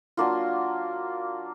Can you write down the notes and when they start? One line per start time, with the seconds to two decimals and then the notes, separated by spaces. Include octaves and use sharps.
0.17 F#3 A#3 D4 F4